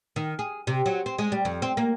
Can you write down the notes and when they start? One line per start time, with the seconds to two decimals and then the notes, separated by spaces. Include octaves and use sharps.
0.16 D#3
0.39 G#4
0.67 C3
0.86 F#3
1.06 C4
1.18 G#3
1.32 G3
1.45 F2
1.62 C4
1.77 A#3